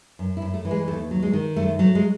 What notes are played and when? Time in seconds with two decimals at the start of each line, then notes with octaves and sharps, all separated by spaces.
0.19 F#2
0.37 E4
0.42 F#2
0.54 A3
0.65 E3
0.71 G#3
0.88 D#2 A3
1.11 F#3
1.22 G#3
1.33 D#3
1.56 F#2 A3
1.79 F#3 A3
1.95 G#3